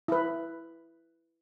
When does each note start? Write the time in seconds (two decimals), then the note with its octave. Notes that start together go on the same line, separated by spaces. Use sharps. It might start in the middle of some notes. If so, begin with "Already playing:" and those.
0.08 E4 B4